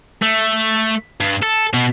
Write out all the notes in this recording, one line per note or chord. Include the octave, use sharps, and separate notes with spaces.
A3
G2
A4
B2